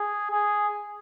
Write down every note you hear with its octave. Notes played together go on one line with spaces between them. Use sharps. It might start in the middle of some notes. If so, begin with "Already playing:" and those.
Already playing: G#4
G#4